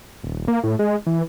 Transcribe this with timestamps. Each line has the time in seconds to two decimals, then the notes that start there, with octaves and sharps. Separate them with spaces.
0.24 D#1
0.48 A#3
0.64 A2
0.79 G#3
1.06 E3